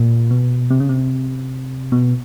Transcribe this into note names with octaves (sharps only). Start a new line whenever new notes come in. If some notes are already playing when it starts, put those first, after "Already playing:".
Already playing: A#2
B2
C3
C#3
C3
B2